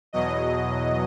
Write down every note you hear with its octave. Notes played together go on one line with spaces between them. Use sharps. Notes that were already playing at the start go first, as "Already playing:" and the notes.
E2 B2 F#3 D#5